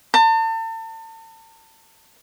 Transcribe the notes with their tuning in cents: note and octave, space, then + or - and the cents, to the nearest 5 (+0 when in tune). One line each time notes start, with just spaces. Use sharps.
A5 +40